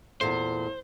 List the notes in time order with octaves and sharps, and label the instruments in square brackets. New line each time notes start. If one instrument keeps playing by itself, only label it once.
[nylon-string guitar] E2 A#2 A3 [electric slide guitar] C5